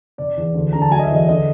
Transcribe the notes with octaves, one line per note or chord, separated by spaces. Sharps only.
F1 D5
E2
D2
D3 A#5
A5
F#3 G#5
D#5
E5
E2
D#5
D3 D#5